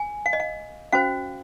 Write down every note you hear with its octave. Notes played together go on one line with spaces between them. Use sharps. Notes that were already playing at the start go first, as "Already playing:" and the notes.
Already playing: G#5
F5
D#5
F5
C#4 F#4 C5 F5